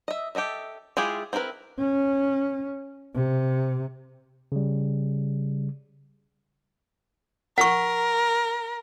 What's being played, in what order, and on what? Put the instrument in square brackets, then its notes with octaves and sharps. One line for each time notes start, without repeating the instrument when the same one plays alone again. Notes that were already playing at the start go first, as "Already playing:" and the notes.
[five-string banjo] D#5 E5
G4 A4 D#5 E5
G#3 E4 F4 G4 G#4
C4 D4 E4 A#4 B4
[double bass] C#4
C3
[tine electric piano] C#3 G3
[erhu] A#4 [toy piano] F#5 C#6